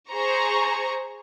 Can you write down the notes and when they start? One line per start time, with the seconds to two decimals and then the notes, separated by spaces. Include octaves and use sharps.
0.10 G#4 C5 A#5 C#6